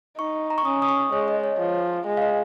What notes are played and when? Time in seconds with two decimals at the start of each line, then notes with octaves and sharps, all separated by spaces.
0.18 D#4 C#6
0.50 A#5
0.58 C#6
0.65 C#4 D#6
0.82 D#6
0.89 C#6
1.12 G#3 C#5
1.28 D#5
1.44 C#5
1.59 F3
2.06 G#3
2.17 F5
2.22 D#5